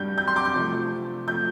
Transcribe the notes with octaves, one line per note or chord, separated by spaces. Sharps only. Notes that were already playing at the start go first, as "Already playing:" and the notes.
Already playing: G2 G3 G6
G6
C6
D6
G6
C3 F3 A3
F3 A3 G6